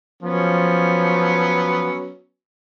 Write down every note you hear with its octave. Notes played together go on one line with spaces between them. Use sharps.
F3 F#3 B3 C#4